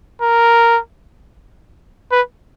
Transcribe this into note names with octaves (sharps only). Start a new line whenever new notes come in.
A#4
B4